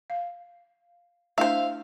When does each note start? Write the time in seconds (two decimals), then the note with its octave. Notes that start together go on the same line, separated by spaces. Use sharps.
0.10 F5
1.38 A3 D4 E4 C5 E5 F5